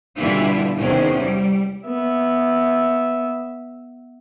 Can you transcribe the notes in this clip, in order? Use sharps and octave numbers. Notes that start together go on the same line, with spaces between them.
B2 D3 E3 G3 E4 F4
E2 C3 D#3 C4 C#4
G3
B3 E5